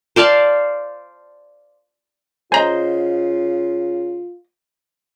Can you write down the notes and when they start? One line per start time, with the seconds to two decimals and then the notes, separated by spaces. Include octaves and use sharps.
0.16 C5 D5 F5 A5
2.52 C#3 F4 C5 D#5 G#5 A#5